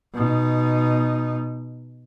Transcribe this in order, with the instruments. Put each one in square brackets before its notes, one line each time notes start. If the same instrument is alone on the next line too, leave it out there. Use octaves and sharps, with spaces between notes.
[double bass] B2 D#4